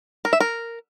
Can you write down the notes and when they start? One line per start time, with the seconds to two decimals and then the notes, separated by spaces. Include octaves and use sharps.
0.25 A#4
0.33 E5
0.40 A#4